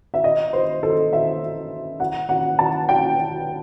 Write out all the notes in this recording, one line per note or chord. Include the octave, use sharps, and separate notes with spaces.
E5
D#5
C5
A4
E5
F#5
F#5
A5
G5